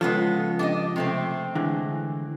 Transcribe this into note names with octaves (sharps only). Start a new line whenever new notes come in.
C#2 C#3 F3 G#3 B3 A4
D4 G4 D#5
C3 A3 C4
D3 E3 G#3